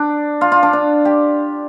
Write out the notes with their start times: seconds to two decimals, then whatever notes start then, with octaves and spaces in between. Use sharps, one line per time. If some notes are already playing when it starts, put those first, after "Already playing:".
Already playing: D4
0.41 F4
0.52 F4
0.63 D4
0.73 D4
1.05 G4